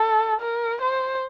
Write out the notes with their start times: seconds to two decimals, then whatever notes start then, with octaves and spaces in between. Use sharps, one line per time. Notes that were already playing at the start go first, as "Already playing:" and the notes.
Already playing: A4
0.41 A#4
0.82 C5